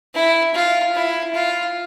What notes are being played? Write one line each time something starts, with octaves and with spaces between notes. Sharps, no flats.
E4
F4
E4
F4